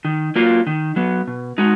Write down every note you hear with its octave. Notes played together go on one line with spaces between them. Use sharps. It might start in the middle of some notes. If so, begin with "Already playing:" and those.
D#3
F#3 A#3 F4
D#3
F#3 B3
B2
G#3 D#4 F#4